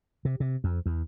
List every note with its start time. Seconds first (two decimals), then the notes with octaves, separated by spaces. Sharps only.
0.25 C3
0.40 C3
0.64 F2
0.86 E2